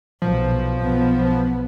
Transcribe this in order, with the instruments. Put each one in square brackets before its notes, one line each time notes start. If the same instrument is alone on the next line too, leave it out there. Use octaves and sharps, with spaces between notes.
[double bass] B1 [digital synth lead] F3
[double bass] B1 B3